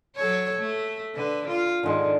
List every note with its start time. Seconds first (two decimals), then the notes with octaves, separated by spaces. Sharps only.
0.16 F#3 A4 C#5
0.58 A3
1.14 D3 B4
1.48 F4
1.83 G#2 D3 D#3 G#3